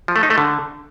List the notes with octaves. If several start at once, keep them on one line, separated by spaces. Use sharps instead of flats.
F3
A3
D#4
A3
D3